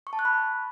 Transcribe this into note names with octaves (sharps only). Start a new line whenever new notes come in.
C#6
A5
F#6
B5